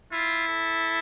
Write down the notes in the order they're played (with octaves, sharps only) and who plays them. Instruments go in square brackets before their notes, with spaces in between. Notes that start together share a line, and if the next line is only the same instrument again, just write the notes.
[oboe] E4 [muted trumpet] F4
[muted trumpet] A4